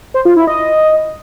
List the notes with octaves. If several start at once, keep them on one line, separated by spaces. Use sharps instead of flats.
C5
F4
E4
D#5